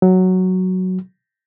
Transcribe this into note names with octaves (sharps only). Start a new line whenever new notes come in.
F#3